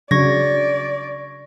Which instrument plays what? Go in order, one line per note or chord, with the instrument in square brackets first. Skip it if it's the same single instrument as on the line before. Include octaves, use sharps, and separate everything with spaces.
[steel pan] C#3 F#3 D4 [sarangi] D5 [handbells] C#6 G#6 A#6